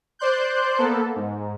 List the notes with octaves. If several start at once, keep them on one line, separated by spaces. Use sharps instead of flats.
C5 D5 C6 F#6 G6
A#3 B3 A4
G#2